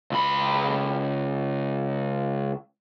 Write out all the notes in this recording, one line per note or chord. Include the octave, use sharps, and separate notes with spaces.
C#2 B5